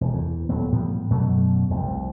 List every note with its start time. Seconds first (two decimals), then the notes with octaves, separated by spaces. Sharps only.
0.01 E1
0.14 E2
0.49 D#1 F2 F#3 B3
0.72 A2 F3 G3 B3
1.10 F#2 B2 F#3 A3
1.70 F1 C2